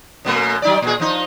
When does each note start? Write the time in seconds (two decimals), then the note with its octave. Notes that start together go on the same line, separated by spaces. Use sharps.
0.25 F#2 B2 A3
0.62 F#3 D#4 D5
0.82 A#2 G#4
1.00 F3 D#4